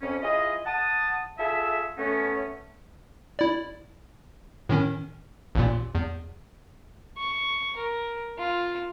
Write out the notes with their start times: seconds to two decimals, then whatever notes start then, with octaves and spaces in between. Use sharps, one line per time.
0.01 F2 C#4
0.22 E4 F4 G#4 D#5
0.66 F#5 A5 D#6
1.38 F4 G#4 A4 E5
1.98 A3 B3 C#4
3.39 E4 D5
4.69 A2 D#3 C#4
5.55 A1 D#2 A#2
5.95 E2
7.18 C#6
7.77 A#4
8.39 F4